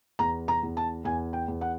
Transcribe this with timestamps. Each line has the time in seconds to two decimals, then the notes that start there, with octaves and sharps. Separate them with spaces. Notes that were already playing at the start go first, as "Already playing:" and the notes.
0.19 E2 A#5
0.48 A#5
0.63 E2
0.77 A5
1.04 E2 G#5
1.33 G5
1.48 E2
1.61 F#5